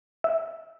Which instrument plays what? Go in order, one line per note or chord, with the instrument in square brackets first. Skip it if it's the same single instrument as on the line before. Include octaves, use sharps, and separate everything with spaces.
[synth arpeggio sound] E5